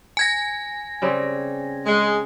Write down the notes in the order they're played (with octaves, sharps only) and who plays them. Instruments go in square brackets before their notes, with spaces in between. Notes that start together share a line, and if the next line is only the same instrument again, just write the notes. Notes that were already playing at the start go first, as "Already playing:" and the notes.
[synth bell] G#5 G#6 A#6
[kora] C#3 G3 C4
[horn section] G#3